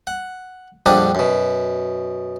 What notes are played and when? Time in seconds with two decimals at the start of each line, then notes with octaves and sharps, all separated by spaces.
0.07 F#5
0.86 A#1 F2 G3 D4 F#5 D#6
1.15 F#2 B2